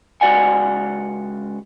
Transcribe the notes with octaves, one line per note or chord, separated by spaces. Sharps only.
C#2 G#3 F#4 D5 F#5 G#5